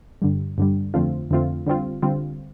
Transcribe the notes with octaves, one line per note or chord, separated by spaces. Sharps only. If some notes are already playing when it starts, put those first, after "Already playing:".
G2 D3 G3
G2 D3 G3
F2 D3 A3 C4 F4
F2 D3 A3 C4 F4
D3 G3 C4 F4
D3 G3 C4 F4